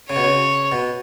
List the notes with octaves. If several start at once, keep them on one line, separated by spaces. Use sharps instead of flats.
C#3 C#5
B2
C#3
B2